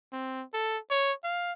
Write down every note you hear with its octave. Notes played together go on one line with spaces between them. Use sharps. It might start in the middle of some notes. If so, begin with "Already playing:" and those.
C4
A4
C#5
F5